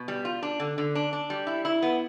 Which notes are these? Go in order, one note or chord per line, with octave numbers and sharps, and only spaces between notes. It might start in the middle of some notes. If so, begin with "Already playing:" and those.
Already playing: B2
G3
F4
D4
D3
D3
D4
D4
G3
E4
E4
B3